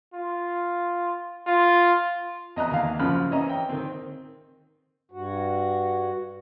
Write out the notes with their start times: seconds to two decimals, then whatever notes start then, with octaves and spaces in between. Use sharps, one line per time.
0.14 F4
1.47 F4
2.56 E2 D#5 A#5 F#6
2.71 D#2 F5
2.99 F#2 C#3 F3 B5 F6
3.31 E3 C#4 D#5 E5 A#5
3.49 G5
3.69 D#3 C4
5.11 G2 F#4